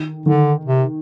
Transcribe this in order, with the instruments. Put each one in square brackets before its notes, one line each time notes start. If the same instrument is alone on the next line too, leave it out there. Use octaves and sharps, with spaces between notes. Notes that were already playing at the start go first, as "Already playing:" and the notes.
Already playing: [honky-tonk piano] D#3
[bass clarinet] D3 [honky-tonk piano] D#3
[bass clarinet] C3